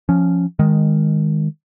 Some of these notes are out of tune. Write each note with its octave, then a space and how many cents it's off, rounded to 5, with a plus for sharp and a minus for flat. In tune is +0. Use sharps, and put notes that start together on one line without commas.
F3 +0 C#4 +0
D#3 +0 G#3 -10